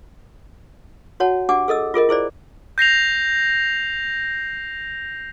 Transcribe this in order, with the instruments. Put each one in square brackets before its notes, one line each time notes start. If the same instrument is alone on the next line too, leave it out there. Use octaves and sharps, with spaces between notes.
[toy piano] F#4 C#5 F#5 A5
D4 G4 F#5 G#5 D6
G#4 A4 D#5 E6
F4 G#4 A#4 D#5
E4 G#4 C5 D5
[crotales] G6 A#6 C7 F7